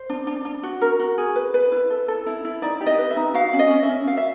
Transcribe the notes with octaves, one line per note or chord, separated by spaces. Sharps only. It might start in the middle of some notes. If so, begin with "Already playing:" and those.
Already playing: C5
D4
D4
D4
F#4
A#4
F#4
G#4
B4
B4
E4
A4
A4
E4
E4
D#4 D5
G4
D#5
B4
E5
D#4
F#4 F5
C#4
D#5
C#4
E5
C#4
F#4 F5
E5